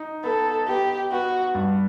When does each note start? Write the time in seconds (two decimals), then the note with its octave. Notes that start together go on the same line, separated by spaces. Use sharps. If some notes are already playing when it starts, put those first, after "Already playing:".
Already playing: D#4
0.24 B3 A4
0.67 B3 G4
1.11 B3 F#4
1.55 G2